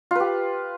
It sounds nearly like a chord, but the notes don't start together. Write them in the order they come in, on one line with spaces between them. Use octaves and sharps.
F4 B4 G4